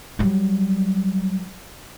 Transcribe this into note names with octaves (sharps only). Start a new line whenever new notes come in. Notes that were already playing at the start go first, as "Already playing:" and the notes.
F#3 G3